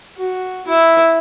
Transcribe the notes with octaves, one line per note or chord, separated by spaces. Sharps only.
F#4
E4 E5